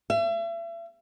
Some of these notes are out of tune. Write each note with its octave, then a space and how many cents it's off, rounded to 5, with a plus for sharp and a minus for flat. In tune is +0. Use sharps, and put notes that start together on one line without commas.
E5 +40